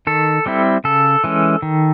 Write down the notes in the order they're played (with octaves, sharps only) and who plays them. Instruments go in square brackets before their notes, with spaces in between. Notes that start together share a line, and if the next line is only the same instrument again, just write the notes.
[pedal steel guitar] D#3 A4
G3 C4 E4
C#3 A4
E3 G#3 C#4
D#3